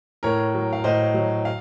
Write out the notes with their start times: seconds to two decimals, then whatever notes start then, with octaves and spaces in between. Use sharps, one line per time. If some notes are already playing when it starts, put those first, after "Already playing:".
0.23 A2 A#4 C#5
0.54 F#3
0.73 F5
0.84 A2 C5 D#5
1.14 F#3
1.45 F5